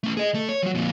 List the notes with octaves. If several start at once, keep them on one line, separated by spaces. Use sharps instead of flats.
A3 C#4
G#4 D#5
A3
C#5
F3 F#3
F2 A#2